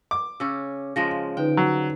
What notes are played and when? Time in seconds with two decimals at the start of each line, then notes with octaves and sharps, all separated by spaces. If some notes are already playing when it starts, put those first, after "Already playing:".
0.11 D6
0.40 C#3 C#4 E6
0.96 C#3 F3 G#3 A#6
1.37 D3 D#4 B4 G5
1.57 F#3